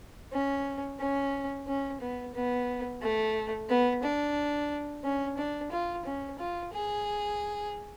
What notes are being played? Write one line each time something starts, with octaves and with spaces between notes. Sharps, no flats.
C#4
C#4
C#4
B3
B3
A3
B3
D4
C#4
D4
F4
C#4
F4
G#4